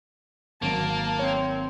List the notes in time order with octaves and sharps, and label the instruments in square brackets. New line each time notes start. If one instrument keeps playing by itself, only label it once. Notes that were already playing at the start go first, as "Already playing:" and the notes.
[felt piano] G#1 F#3 [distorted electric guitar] A#3 [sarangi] A5
[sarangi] C4 [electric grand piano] C#5